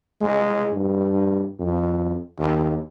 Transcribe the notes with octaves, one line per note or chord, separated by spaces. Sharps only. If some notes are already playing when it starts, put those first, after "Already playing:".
G#3
G2
F2
D#2